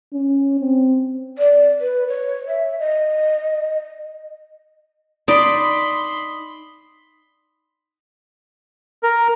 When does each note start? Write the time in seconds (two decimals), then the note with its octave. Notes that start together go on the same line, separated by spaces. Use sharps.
0.13 C#4
0.60 C4
1.38 D5
1.81 B4
2.08 C#5
2.47 E5
2.79 D#5
5.28 D#4 D5 B5 C6 D#6
9.03 A#4